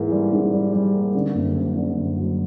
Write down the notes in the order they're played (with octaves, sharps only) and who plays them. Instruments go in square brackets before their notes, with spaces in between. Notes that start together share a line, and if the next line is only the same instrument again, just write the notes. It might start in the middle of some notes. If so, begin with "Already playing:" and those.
Already playing: [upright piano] G#2 E3 A#3
G3
G#2
G3
G3
A#3
D3
F#1
F#2
D3
F#1
F#3